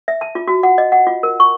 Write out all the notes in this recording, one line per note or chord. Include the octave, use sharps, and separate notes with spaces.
E5
A5
F4
F#4
F#5
D#5
F#5
F4
A#4
C#6